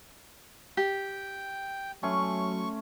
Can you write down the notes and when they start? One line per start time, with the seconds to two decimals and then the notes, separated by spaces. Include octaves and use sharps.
0.77 G4 G5
2.03 F#3 A3 C#4 C6 C#6